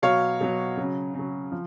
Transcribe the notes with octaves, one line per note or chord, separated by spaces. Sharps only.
B2 F#3 C#5 F5
B2 F#3
C#3 F#3
C#3 F#3
F3